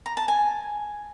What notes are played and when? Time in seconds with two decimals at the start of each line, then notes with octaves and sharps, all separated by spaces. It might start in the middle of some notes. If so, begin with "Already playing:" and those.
0.06 A#5
0.17 A5
0.28 G#5